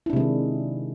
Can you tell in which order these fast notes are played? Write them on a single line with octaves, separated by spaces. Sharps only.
E4 D4 C3 G#3 D#3